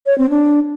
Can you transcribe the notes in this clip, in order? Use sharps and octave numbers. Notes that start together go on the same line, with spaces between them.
C#5
C4
D4